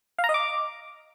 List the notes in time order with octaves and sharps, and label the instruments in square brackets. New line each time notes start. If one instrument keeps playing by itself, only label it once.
[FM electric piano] F5
A#5
D#5
D6